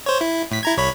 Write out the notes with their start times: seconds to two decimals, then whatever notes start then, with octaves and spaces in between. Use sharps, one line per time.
0.06 C5 C#5
0.21 E4
0.51 A2 B6
0.63 E4 A#5 G#6
0.77 C2 C#5 B5